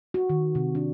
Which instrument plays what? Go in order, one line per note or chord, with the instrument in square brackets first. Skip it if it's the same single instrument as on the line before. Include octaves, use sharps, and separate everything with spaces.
[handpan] F#4
D#3
C3
D4